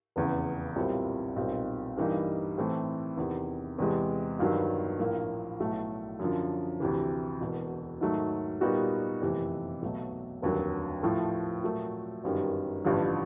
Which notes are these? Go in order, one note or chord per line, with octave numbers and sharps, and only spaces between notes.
F1 E2 C#3
B1 A#2 G3 C4 E4
B1 A#2 G3 C4 D#4
G2 E3 G3 A#3 D#4
A2 E3 A3 C4
E2 C3 D#3
E2 C3 E3 G#3
G1 G2 D#3 F#3
A#1 A2 F3 A#3
B1 A2 F#3 A3
F#2 D3 F3
D2 C3 E3
E1 E2 B2
G#2 D#3 F#3 A3
A#2 G3 B3 D#4 F#4
F#1 F2 C3 E3 A3
B1 B2 F#3 A3
F1 D#2 D3 F#3
A2 F3 A3
A#2 F#3 A3
G1 F#2 D#3 G3
A1 G2 D3 F3